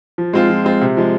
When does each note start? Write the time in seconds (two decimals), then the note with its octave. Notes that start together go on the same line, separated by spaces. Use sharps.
0.18 F3
0.33 G#3 C4 F4
0.50 F3
0.65 G#3 C4 F4
0.81 C3
0.97 F3 G#3